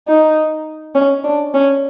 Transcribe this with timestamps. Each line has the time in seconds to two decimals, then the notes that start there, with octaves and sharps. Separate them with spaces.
0.08 D#4
0.95 C#4
1.24 D4
1.54 C#4